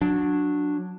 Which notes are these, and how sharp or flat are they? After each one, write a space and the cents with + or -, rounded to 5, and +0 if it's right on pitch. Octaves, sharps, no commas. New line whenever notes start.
F#3 -15 D4 +0